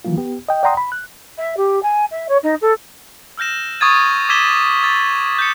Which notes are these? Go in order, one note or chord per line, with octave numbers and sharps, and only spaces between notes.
D#3 E3 F#3 A#3 F4
B3 G4
D#5 G5
D5 F#5 G5 A#5 C6 D#6
B5
F#6
E5
G4
G#5
E5
C#5
D#4
A4
E6 F6 G6 A#6 E7
C#6 D#6 G#6 A6 D#7
D6 E6 G#6 B6 E7 G7
E6 A6
G6 C#7